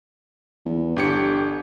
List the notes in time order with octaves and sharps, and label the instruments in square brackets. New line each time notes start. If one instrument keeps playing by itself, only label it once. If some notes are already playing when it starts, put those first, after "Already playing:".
[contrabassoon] E2
[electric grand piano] G1 G4 C#7 [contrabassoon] D3